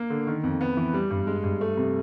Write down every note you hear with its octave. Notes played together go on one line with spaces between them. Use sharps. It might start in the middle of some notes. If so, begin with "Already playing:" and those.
Already playing: A#3
D3
D#3
F2
B3
E3
G3
G2
G#3
G2
A3
C3